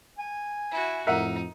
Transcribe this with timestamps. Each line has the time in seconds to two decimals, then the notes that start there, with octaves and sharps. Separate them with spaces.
0.18 G#5
0.71 E4 F#4
1.07 F2 A2 D#4 A#4 E5 F#5